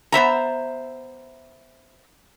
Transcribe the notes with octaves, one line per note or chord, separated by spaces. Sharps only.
B3 C5 E5 A#5